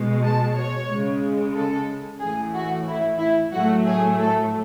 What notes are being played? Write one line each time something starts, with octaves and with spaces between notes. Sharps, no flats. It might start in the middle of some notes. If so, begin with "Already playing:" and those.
Already playing: B2 G#3
A5
C#5
C#3 G#3
A4
A2 E3 A3 G#4
F#4
E4
E4
A2 F#3 A3 F#4
G#4
A4